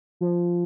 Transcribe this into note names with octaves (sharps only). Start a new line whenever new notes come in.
F3